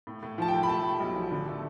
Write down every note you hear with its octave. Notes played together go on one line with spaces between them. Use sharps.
A2
A2
F3 A5
G5
A2
B5
A3 A5
A2
B1
F3
D3
A3